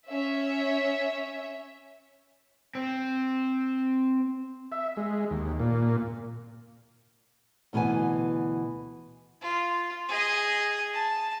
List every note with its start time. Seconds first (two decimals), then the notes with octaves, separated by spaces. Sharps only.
0.12 C#4 E5
2.75 C4
4.72 E5
4.97 G#3
5.31 D#2
5.60 A#2
7.73 D2 B2 E3 B3 G#5
9.42 F4
10.09 G#4 D#5
10.93 A5